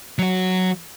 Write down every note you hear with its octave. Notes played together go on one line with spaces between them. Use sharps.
F#3 F#4